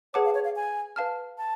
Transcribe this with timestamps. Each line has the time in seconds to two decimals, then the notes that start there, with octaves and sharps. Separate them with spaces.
0.14 G#4 B4 C#5 F#5 A5 D6
0.25 F5
0.34 C#5
0.45 F5
0.56 G#5
0.96 B4 F5 A5 F6
1.38 A5